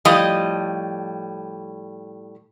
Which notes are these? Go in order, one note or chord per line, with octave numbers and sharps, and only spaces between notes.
A2 F3 G3 D#5